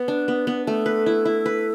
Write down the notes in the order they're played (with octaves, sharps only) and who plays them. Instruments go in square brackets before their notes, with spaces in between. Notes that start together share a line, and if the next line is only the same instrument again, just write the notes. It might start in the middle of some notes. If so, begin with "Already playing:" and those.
Already playing: [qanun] B3 [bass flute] B4
[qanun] D4
B3
B3
[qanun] A3 [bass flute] A4
[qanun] B4
E4
E4
B4